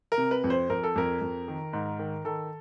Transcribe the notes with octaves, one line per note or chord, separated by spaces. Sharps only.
A#4
C3
B4
F2
C5
F2 A#4
A4
F2 A#4
F2
D#3
G#2
D#3
D#3 A4